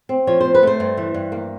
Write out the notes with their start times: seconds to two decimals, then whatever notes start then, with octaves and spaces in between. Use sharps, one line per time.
0.09 C4
0.27 F3 C#5
0.40 C3 C5
0.55 B4
0.63 A3 C5
0.80 G2
0.97 E3
1.14 G2
1.32 A#3